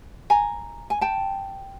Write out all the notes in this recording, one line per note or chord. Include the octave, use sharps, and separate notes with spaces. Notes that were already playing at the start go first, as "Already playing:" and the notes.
G#5 A#5
G#5
G5 A5